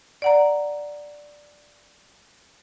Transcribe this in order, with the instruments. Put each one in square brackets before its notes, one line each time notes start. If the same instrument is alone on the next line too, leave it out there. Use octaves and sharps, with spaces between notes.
[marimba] D5 F#5 A#5